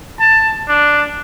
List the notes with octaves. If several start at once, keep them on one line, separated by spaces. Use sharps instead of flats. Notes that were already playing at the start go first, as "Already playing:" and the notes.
A5
D4